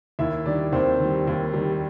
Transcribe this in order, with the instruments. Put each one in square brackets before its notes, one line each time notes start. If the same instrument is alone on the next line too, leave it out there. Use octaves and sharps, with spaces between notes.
[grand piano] D#2 E4 E5
D#3 G3 D4 D5
D#2 C4 C5
D#3 G3
D#2
D#3 G3